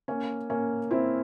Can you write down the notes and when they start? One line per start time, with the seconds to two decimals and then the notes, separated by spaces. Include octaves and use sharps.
0.08 A#3 C#4
0.50 A#3 C#4
0.91 C4 E4